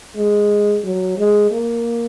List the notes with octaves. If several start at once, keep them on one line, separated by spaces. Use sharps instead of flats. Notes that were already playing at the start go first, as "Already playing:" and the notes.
G#3
F#3
G#3
A#3